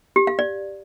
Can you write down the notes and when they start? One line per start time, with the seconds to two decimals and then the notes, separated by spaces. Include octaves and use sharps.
0.16 G4
0.27 F5
0.39 D5